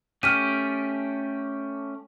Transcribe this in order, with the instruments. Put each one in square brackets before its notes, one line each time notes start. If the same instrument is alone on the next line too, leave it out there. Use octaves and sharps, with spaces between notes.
[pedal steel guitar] A3 C#4 G4 [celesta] F6 B6 D#7